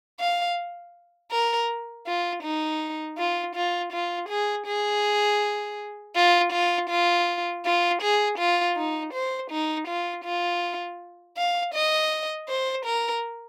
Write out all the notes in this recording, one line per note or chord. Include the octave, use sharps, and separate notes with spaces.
F5
A#4
F4
D#4
F4
F4
F4
G#4
G#4
F4
F4
F4
F4
G#4
F4
D#4
C5
D#4
F4
F4
F5
D#5
C5
A#4